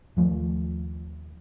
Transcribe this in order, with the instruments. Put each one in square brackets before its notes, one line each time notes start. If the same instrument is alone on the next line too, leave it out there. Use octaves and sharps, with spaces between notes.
[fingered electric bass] D#2 F3 A3